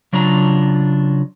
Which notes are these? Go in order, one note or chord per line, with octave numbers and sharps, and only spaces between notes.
C#3 F#3 D4 F4 A#5